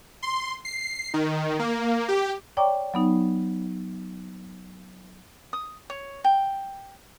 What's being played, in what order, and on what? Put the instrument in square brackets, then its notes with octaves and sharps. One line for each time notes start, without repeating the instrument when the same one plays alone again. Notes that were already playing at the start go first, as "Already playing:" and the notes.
[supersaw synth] C6
C7
D#3
A#3
G4
[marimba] C#5 D5 G5 A#5 C#6 D6
F#3 B3 D#4
[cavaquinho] D#6
C#5
G5